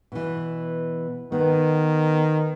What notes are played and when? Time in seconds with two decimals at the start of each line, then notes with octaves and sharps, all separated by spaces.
0.12 B2 E3
1.32 D#3 B3